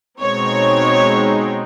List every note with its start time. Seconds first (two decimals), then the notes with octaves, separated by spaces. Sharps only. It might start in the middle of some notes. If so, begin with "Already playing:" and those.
0.19 B2 G#3 C4 D#4 C#5